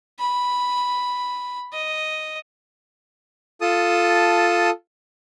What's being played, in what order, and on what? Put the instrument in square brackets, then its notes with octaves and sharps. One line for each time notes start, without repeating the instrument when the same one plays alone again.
[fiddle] B5
D#5
[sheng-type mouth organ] F4 A4 A5 D#6